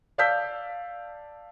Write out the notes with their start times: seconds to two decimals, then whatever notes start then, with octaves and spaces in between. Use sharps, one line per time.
0.18 D5 F5 A5 E6 G6 B6